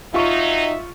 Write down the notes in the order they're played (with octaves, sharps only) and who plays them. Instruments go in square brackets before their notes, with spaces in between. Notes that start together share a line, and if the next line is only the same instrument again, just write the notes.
[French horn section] F#3 D#4 [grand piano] F4 C#6 [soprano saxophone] E5